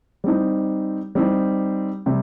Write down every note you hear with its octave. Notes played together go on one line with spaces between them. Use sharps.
G3 C4 D#4
G3 C4 D#4
C3 G3